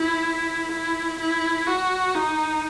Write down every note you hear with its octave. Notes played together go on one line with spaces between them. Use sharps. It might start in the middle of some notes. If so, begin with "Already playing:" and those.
Already playing: E4
E4
E4
F#4
D#4